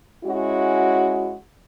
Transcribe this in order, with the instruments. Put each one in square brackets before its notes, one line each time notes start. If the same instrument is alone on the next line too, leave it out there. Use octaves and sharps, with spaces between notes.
[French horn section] G#3 C#4 E4 F#4